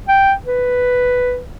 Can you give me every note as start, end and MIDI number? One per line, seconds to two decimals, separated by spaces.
0.09 0.33 79
0.46 1.39 71